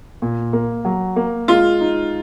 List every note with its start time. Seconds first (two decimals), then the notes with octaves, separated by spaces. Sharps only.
0.22 A#2
0.53 A#3
0.85 F#3
1.16 A#3
1.48 G#3 F4
1.80 D#4